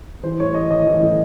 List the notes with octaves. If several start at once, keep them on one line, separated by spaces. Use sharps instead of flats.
E3 C5
A2 C#5
E3 D#5
A2 D#5
E3
A2